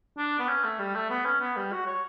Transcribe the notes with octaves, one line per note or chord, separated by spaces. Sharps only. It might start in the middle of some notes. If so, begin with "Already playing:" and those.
D4
B3
C#4
A3
G3
A3
B3
C#4
B3
G3
F#4
C#5